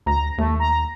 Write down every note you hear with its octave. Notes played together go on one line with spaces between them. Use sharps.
D2 A#5
D#2 A3
A#5